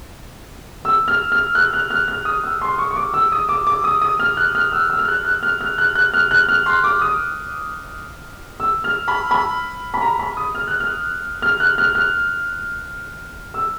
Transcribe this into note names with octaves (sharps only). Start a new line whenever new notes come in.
E6
F6
F6
F#6
F6
F6
F6
D#6
E6
C6
C#6
C#6
D6
E6
D#6
D6
D6
D#6
D#6
F6
F#6
F6
E6
E6
F6
F#6
F#6
F6
F6
F#6
F#6
F6
F#6
F6
C6
D6
D#6
E6
F6
B5
B5
B5
A#5
B5
D#6
F6
F#6
F6
F6
F#6
F6
F6
E6